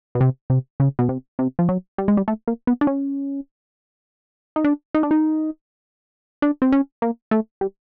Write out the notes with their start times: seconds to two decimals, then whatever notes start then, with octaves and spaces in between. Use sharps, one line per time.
0.15 B2
0.21 C3
0.50 C3
0.80 C#3
0.99 B2
1.09 C3
1.39 C3
1.59 F3
1.69 F#3
1.98 G3
2.08 G#3
2.17 G3
2.28 A3
2.48 A#3
2.67 B3
2.81 D4
2.87 C#4
4.56 D#4
4.64 D4
4.94 D#4
5.03 D4
5.11 D#4
6.42 D4
6.62 C4
6.72 C#4
7.02 A#3
7.31 A3
7.61 G3